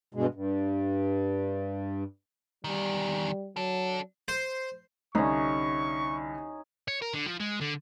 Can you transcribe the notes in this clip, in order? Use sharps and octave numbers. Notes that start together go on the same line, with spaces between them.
G2 B2 G#3
G2
E2 D#3 G3
F#3 D4 A4
C5
C2 D3 C#4 D#4 C#6
C#5
A#4
D3
F3
G#3
D3